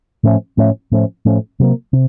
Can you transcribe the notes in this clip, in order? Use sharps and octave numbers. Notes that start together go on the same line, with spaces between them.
A2 F3 A3 C#4
A2 F3 A3 C#4
A2 F3 A3 C#4
A2 F3 A3 C#4
C3 F#3 A#3
C3